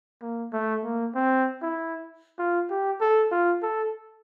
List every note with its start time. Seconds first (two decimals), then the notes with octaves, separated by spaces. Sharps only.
0.22 A#3
0.53 A3
0.84 A#3
1.15 C4
1.62 E4
2.39 F4
2.70 G4
3.01 A4
3.31 F4
3.63 A4